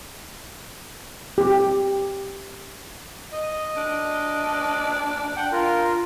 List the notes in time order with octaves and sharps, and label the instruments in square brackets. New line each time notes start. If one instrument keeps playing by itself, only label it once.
[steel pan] G4
[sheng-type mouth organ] D#5
[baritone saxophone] D4
[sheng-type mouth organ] F#5 G5
F4 A#4